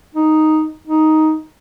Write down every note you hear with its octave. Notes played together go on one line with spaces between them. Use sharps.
D#4
D#4